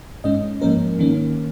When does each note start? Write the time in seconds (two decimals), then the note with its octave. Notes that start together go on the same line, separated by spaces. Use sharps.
0.24 G#2 G#3 C#4 D#5
0.61 G#2 F3 A#3 C#4 A#4
0.99 D#3 A#3 C#4